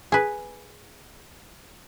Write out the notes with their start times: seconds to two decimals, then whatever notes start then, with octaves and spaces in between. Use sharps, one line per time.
0.12 G#4 B4